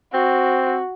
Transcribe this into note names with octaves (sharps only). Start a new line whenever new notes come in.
C4 F#4